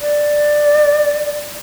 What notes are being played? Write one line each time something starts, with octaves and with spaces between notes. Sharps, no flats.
D5